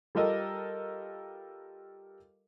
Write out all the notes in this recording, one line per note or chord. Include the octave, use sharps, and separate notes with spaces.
G3 F4 G4 A4 A#4 D#5